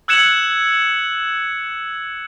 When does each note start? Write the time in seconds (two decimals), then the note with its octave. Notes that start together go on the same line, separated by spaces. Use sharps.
0.08 E6 F#6 G#6 C#7 E7 F#7